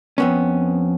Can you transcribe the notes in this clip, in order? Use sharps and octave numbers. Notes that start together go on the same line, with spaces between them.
F2 B3 C#4